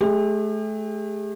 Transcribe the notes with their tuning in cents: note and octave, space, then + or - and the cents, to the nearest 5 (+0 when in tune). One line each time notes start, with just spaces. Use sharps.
A3 -35 G4 +45